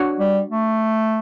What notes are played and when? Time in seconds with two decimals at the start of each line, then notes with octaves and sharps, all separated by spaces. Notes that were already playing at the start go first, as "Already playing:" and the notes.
Already playing: D4 F#4 C#5 F#5
0.19 G3
0.51 A3